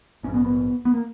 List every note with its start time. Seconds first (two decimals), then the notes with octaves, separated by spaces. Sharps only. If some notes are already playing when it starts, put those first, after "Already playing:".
0.23 A#1 C#4
0.28 G#2
0.34 B3
0.45 B3
0.85 B3
0.94 A#3